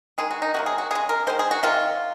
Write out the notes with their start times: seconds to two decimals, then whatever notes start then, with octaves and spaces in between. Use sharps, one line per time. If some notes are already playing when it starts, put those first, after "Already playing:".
0.18 D#3 G#3 G#4
0.31 F#4
0.42 D#4
0.54 C3 F#3 A#3 F#4
0.66 G#4
0.78 F#4
0.91 C#3 G#3 G#4
1.09 A#4
1.27 D#3 G#3 C5
1.39 G#4
1.51 F#4
1.63 C3 D#3 F#3 F4